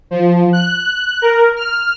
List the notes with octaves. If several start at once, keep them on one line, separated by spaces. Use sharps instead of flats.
F3
F#6
A#4
F6